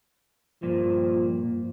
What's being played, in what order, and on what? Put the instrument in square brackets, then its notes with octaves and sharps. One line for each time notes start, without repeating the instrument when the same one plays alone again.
[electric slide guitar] G2 A#2 A#3 [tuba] F3